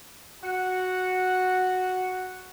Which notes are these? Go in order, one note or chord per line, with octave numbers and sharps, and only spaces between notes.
F#4 F#5